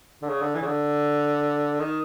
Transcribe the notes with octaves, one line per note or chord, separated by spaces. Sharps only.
D3
C#3
D3
E3
C#3
D3
D#3